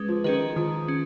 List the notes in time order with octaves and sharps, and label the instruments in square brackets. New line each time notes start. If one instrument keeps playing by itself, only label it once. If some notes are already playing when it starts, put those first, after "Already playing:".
Already playing: [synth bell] G#3 C#4 G#4 B4
[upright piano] F3
[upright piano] D#3 [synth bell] C#4 G#4 B4
[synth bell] D#3 [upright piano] F3
[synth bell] C#4